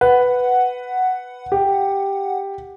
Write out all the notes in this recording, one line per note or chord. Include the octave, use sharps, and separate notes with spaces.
B4 F#5
G4